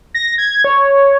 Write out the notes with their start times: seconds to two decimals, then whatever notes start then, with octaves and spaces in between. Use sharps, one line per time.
0.14 A#6
0.38 G#6
0.64 C#5